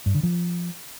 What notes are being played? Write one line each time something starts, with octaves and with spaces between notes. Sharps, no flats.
G2
D3
F3